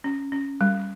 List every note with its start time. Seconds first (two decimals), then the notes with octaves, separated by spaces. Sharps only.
0.04 C#4
0.32 C#4
0.61 G3